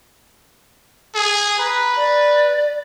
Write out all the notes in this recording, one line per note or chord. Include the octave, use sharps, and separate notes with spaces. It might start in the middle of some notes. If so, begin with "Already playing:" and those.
G#4
B4 A#5
D5